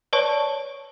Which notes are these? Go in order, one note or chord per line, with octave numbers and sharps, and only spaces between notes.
B4 C#5 D5 A5 C#6